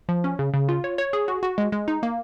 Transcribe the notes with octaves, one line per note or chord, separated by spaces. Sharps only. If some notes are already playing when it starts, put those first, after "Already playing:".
F3
C#4
C#3
C#3
F4
C#5
C#5
G#4
F#4
F#4
G#3
G#3
D#4
A#3